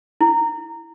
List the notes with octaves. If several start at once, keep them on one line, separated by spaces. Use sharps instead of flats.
E4